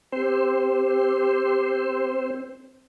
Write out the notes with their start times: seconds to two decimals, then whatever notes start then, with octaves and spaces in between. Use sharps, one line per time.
0.12 C4 G4 C5